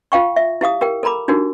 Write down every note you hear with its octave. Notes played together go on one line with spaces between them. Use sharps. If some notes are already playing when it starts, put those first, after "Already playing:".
F4 F5 G5 C#6
E5
E4 G4 F5 D#6
G4 A#4 G5
A4 A#4 A#5 B5 D6
D4 D#4 F#4 G4 A#4